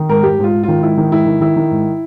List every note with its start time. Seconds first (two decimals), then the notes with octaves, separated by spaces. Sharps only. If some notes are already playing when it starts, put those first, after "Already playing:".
Already playing: D#3
0.09 G#2 A#4
0.23 G#2 G4
0.39 G#2
0.44 F4
0.52 G#2
0.63 D#3 F4
0.82 G#2 E4
0.97 D#3
1.11 G#2 E4
1.26 D#3
1.41 D#3 E4
1.56 D#3
1.71 G#2